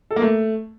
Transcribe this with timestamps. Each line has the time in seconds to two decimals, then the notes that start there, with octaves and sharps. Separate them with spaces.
0.11 A4
0.16 A#3
0.22 A3